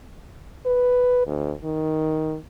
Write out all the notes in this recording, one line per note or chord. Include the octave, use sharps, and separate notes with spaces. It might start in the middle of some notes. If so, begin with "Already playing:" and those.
B4
D2
D#3